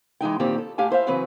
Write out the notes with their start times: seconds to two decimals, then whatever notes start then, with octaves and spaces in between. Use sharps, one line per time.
0.21 E3 G#3 D#4 G5
0.40 A#2 D#3 E3 C4 G4
0.58 A4
0.78 A2 G4 F5 G#5
0.90 E4 C5 E5 F5
1.07 C#3 E3 F#3 C4 B4